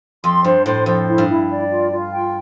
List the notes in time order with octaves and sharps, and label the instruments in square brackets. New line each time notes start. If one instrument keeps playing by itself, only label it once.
[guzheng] F2 [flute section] C6
[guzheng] G2 [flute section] C5
[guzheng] A2 [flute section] C5
[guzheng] F2 [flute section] C5
[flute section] E4
[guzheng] G2
[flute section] E4
D5
F4
F4
G5